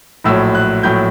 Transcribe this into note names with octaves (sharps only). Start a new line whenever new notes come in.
A#1 A2 F#3 E6
F#6
A#1 A2 F#3 G6